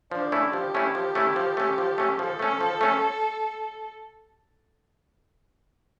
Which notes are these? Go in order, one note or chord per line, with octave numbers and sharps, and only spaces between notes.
F3 D4
A3 C#4 E4
F3 G4
A3 C#4 E4
F3
A3 C#4 E4
F3
A3 C#4
F3
A3 C#4
F3 A4
A3 C#4
F3
A3 C#4